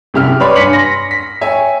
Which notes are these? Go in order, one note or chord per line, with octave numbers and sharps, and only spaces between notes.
C2 F#2 G4 E5 F6
B4 C#5 D5 B5 C6 D6
G2 G#5 B6 C#7 F#7
C6 A#6
B6
C#5 E5 G5 G#5